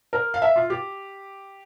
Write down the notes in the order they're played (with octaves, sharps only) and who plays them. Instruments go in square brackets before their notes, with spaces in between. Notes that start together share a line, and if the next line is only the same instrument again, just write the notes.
[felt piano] A#4
F5
E5
F4
G4